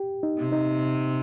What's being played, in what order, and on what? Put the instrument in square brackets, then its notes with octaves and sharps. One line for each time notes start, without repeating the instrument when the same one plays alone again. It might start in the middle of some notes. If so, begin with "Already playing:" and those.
Already playing: [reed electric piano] G4
D#4
[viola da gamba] C3
[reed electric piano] D#4